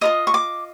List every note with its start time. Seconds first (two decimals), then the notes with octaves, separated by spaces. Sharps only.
0.01 F4 A#4 D#5 D#6
0.27 C#6
0.34 D6